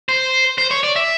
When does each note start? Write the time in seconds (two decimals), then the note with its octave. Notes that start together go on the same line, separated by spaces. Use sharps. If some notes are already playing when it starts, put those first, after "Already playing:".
0.09 C5
0.58 C5
0.71 C#5
0.83 D5
0.96 E5